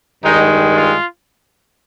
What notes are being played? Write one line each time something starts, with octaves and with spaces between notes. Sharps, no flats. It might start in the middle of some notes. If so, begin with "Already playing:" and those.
G2 D#3 G#3 D#4
F4